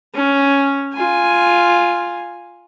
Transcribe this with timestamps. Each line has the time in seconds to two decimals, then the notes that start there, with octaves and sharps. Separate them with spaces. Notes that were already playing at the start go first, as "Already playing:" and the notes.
0.15 C#4
0.93 F4 G#5